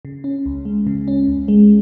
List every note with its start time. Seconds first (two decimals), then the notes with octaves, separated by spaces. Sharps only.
0.05 C#3
0.24 C#4
0.46 C#2
0.65 G#3
0.87 C#3
1.08 C#4
1.27 C#2
1.48 G#3